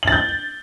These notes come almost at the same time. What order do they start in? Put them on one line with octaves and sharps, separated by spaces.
F#7 A6 G6